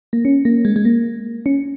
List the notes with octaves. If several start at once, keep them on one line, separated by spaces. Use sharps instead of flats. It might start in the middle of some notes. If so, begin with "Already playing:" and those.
A#3
C#4
A#3
G#3
G#3
A#3
C#4